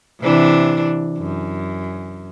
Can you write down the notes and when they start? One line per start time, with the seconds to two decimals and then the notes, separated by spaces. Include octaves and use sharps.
0.21 C3 E3 D4
1.18 F#2